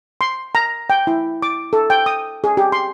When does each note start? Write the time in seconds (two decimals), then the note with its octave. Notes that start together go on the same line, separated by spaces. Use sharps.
0.21 C6
0.55 A#5
0.90 G5
1.07 E4
1.42 D6
1.73 A4
1.90 G5
2.06 D#6
2.44 G#4
2.57 G4
2.72 C6